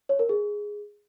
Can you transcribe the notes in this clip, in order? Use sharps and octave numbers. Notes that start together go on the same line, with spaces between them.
C#5
A#4
G#4